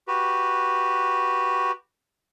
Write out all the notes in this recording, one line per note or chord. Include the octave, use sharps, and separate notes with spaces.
F#4 G4 B4